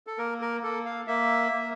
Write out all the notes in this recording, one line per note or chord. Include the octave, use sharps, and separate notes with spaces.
A4
A#3 A#4
A#4
A#3 A4
F5
A#3 E5
A#3